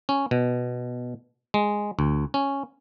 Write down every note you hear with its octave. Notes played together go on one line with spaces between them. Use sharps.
C#4
B2
G#3
D2
C#4